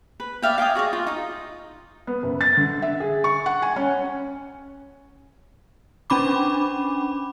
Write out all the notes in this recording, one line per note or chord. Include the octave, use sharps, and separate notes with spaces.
B4
D5 E5 F5 G5
F5 G5 G#5 D#6
F#4 G#4 C#5 D#5
F4
D#4 D#6
B3
F#1
A6
D3
E5
G#4
C#6
F#5
G#5
C#4
C#4 D4 B5 D6